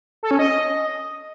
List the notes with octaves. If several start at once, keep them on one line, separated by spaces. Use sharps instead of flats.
A4
C#4
D#5